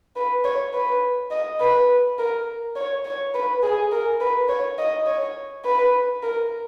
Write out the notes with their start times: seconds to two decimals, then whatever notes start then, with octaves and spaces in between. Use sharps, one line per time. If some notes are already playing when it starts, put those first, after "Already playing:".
0.16 B4
0.44 C#5
0.73 B4
1.31 D#5
1.60 B4
2.19 A#4
2.76 C#5
3.05 C#5
3.34 B4
3.63 G#4
3.91 A#4
4.20 B4
4.49 C#5
4.78 D#5
5.06 C#5
5.65 B4
6.23 A#4